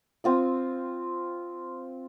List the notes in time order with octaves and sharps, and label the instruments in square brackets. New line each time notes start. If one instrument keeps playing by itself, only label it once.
[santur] C4 F4 D#6